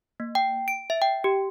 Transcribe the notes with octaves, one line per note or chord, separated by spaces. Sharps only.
A#3
G5
D7
E5
G5
G4